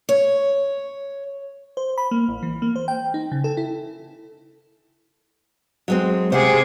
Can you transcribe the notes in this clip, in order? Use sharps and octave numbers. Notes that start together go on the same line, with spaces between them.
C#5
C5
B5
A#3
A1
E3
A#3
C5
G5
D#4
C#3
A4
E4
F#3 G#3 C4
C3 G#4 C5 F#5